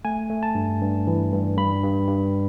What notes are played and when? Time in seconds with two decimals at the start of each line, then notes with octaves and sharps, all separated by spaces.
0.05 A3 G#5
0.30 A3
0.43 A5
0.55 G2
0.81 G2
1.07 E3
1.32 G2
1.57 G2 B5
1.83 G2
2.08 G2